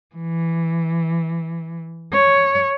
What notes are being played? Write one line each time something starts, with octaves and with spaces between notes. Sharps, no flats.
E3
C#5